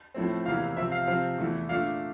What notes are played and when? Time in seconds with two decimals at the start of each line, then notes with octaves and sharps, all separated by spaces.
0.14 A2 F3 A3 C4
0.45 E2 C3 E3 A#3 F5
0.77 C3 F3 C4 E5
0.92 F5
1.07 C3 F3 C4 F5
1.38 E2 E3 A3
1.69 A#2 A3 D4 F5